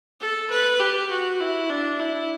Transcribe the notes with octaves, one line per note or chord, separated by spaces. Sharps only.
A4
B4
G4
F#4
E4
D4
E4